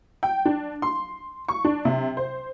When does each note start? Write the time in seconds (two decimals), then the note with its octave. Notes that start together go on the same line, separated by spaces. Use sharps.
0.23 G5
0.45 D4
0.82 C6
1.48 C#6
1.65 D4
1.85 C3
2.17 C5